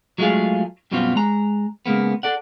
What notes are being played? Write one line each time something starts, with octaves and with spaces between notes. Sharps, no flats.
F#3 G#3 A3 F4 G#4 F5
F#2 B2 G3 B3 C4 F4
G#3 A#5
C#3 G#3 A#3 B3
A4 D5 F#5